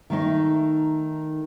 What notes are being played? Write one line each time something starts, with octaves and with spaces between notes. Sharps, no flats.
D#3 A3 D#4